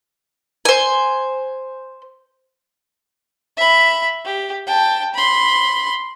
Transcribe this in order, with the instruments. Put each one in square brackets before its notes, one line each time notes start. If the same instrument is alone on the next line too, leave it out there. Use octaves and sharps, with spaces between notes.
[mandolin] C5 G#5
[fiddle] E5 B5
G4
G5 A5
B5 C6